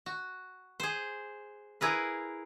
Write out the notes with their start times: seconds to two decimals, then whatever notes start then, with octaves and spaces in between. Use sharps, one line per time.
0.06 F#4
0.80 G#4 C5
1.81 E4 G#4 A#4 B4